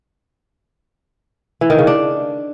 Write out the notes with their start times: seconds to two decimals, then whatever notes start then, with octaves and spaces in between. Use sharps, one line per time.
1.61 E3
1.70 D#3
1.78 C#3
1.87 D4